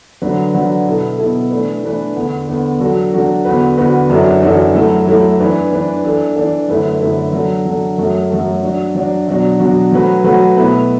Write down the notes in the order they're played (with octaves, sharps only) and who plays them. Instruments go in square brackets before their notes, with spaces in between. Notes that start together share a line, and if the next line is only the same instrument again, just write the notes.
[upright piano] D3 F#3 D4 B4
D3 F#3 D4 B4
B2 B3 E4 A4
B2 B3 E4 A4
E3 A3 D4 B4
E3 A3 D4 B4
E2 D3 B3
E2 D3 B3
F#3 D4 F#4 A4
F#3 D4 F#4 A4
E2 D3 B3 F#4 B4
E2 D3 B3 F#4 B4
F#2 E3 D4 F#4 A4
F#2 E3 D4 F#4 A4
F#3 A3 E4 A4
F#3 A3 E4 A4
E3 D4 B4
E3 D4 B4
E3 D4 A4
E3 D4 A4
F#2 D3 A3 E4 B4
F#2 D3 A3 E4 B4
F#3 D4 A4
F#3 D4 A4
F#2 F#3 A3 F#4 A4
F#2 F#3 A3 F#4 A4
F#3 D4 F#4
F#3 D4 F#4
B2 F#3 D4 F#4
B2 F#3 D4 F#4
F#3 A3 F#4 B4
F#3 A3 F#4 B4
B2 A3 E4 B4